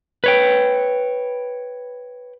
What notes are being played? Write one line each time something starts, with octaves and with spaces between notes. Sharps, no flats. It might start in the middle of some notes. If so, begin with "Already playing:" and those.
B4 C#5 G5